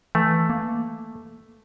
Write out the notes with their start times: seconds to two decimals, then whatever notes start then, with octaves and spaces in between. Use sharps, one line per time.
0.15 E3 A3
0.50 A#3